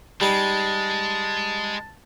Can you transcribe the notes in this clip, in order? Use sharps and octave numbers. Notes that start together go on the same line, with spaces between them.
G3 G#3 D#4 A5